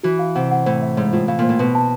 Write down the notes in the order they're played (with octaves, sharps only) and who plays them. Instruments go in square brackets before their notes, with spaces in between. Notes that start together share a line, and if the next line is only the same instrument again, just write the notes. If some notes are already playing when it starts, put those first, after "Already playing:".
[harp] E3 [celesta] F#4
[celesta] F5
[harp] C3 [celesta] F#5
[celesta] F#5
[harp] A2 [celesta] C5
[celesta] E5
[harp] G#2 [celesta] C#5
[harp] A2 [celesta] F4
[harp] A2 [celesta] F5
[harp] A#2 [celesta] C5
[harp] A2
[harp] B2 [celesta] B4
[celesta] A5